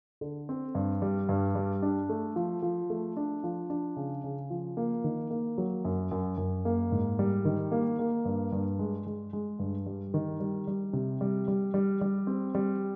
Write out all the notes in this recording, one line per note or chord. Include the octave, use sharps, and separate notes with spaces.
D3
C4
G2
G3
G2
G3
D4
A3
F3
F3
A3
D4
F3
D4
C#3
C#3
F3
A#3
D#3
A#3
F#3
F#2
F#2
F#2
A#3
G#2
G3
D#3
A#3
A#3
G2
G2
G#3
G#3
G#3
G2
G3
D#3
G3
G3
C3
G3
G3
G3
G3
C4
G3